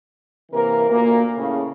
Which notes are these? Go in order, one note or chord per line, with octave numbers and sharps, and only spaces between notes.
C3 E3 A#3 A#4
D2 A#2 A#3
A2 C#3